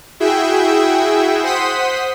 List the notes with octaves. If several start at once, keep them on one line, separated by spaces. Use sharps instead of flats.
E4 F#4 G#4 E5 G5
C5 F#5 C6 D#6 B6